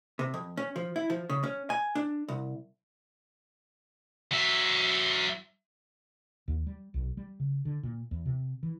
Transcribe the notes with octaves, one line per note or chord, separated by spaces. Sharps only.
C3
F2
C#4
F3
E4
F3
C#3
C#4
G#5
D4
C2
F#3 E5
D#2
G3
B1
G3
C#3
D3
A#2
E2
C3
E3